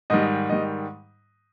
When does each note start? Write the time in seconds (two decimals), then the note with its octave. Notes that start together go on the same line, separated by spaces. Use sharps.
0.10 G#2 D#3 G3 D#5
0.49 G#2 D#3 G3 D#5